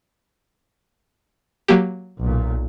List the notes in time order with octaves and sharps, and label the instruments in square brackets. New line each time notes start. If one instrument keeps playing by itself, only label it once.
[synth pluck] F#3 A#3 G4
[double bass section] B1 A#2